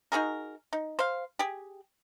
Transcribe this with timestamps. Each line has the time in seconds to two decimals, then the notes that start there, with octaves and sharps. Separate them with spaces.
0.12 D#4 F#4 G#4 A#4
0.73 D#4
0.99 C5 F5
1.39 G4 G#4